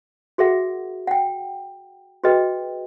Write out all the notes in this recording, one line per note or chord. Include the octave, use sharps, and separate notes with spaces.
F#4 G#4 A#4 E5 F#5
F#5 G5
F#4 G#4 B4 D#5 G5